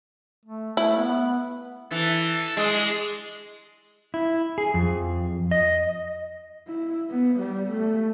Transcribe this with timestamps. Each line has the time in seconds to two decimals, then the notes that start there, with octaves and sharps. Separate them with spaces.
0.46 A3
0.77 A3 E4
0.96 B3
1.91 E3 A4
2.57 G#3 D4
4.14 E4
4.58 G#4
4.74 F2
5.51 D#5
6.67 E4
7.09 B3
7.39 G3
7.71 A3